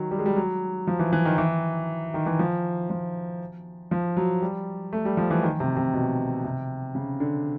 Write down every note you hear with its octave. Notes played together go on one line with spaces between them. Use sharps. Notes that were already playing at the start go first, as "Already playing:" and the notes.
Already playing: D#3 F#3
G3
G#3
G3
F#3
F3
E3
E3
D#3
E3
D#3
E3
F3
F3
F3
F#3
G3
A3
G3
F3
E3
D#3
C3
C3
B2
C3
C#3
D3